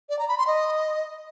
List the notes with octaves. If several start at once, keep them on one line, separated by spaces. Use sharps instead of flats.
D5
A#5
B5
C6
D#5